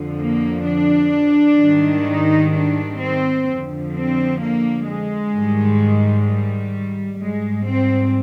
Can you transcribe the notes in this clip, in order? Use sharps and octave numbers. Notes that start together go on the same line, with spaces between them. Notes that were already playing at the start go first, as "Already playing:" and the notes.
Already playing: F2 D3 F3
A#3
D4
G#2 D#3 G3
D#4
D4
C4
F2 D3 F3
C4
A#3
G#3
G#2 D#3 G3
G3
G#2 G3 G#3
C4